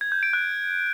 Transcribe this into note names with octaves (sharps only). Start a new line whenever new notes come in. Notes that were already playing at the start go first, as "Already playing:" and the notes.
G#6
G6
D7
F#6